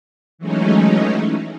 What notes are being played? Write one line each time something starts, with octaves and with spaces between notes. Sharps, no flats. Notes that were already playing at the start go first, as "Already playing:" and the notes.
E3 F#3 G#3 A3 C#4 D#4